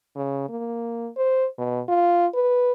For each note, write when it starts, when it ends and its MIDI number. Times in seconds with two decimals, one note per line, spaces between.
0.16 0.47 49
0.49 1.09 58
1.16 1.46 72
1.58 1.81 47
1.89 2.27 65
2.34 2.72 71